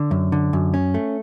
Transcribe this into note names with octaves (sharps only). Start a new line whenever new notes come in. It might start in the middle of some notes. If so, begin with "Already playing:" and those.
Already playing: D3
F#2
D3
F#2
C#4
A3